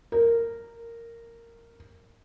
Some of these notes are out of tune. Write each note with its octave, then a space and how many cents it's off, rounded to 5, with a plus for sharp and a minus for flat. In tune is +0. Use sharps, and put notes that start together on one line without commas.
A#4 -10